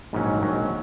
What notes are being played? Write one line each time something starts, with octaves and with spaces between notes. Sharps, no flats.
A#1 G#2 D#3 F#3 C#4
A#1 G#2 D#3 F#3 C#4